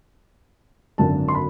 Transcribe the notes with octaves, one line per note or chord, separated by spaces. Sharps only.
G#1 F#2 D3 A5
C6
B5